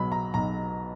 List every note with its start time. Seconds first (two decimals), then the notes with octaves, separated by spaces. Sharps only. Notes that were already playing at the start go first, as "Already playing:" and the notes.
Already playing: B1 B2 F#3 B5
0.12 A#5
0.34 B1 A#5